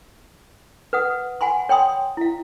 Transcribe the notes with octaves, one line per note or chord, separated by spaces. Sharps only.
B4 F#5 D#6
F#5 G#5 B5 C6
C#5 G5 B5 C6 D#6
E4 F5